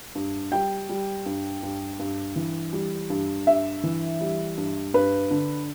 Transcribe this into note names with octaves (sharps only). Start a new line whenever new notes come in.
G2
G3 G5
G3
G2
G2
G2
E3
G3
G2
G2 E5
E3
G3
G2
G2 B4
D3